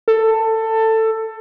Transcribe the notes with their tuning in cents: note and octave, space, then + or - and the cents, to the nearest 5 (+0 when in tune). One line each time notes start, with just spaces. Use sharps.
A4 +15